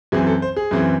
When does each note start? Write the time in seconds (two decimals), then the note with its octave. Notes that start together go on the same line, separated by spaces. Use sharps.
0.12 F#2 E3 C4 G#4
0.27 A4
0.42 C5
0.56 G#4
0.71 F#2 E3 C4